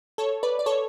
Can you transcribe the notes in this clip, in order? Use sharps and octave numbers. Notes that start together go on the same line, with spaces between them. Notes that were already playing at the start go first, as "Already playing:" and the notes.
A4 C#5
B4 D5
D5
A4 C#5